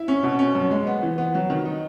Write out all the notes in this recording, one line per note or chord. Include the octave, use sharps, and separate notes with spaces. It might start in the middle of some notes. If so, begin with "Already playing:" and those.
Already playing: E4
C#4
B2
C#4
F#2
G#3
B3
E3
B3
F#3
D#3
D#4